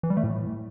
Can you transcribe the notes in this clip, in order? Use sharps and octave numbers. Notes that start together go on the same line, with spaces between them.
E3
G3
A3
A2